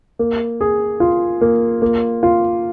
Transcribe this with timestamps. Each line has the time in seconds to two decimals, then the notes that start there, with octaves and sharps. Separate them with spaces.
0.19 A#3
0.61 G#4
1.00 F4
1.41 A#3
1.82 A#3
2.23 F4